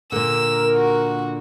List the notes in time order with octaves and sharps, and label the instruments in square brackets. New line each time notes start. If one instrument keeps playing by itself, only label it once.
[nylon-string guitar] A#2 D3 [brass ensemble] A#4 [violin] E6
[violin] F#4